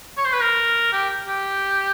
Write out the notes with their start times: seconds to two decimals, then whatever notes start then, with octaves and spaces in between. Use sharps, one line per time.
0.17 C#5
0.25 C5
0.33 B4
0.41 A#4
0.93 G4
1.28 G4